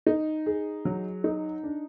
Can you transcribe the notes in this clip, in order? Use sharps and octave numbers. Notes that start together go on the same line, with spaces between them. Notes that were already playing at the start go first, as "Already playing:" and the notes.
D#4
G#4
F#3
D#4
D4